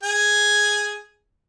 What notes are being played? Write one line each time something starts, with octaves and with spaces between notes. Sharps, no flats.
G#4 G#5